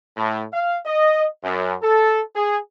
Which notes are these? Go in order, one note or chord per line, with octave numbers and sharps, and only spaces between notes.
A2
F5
D#5
F#2
A4
G#4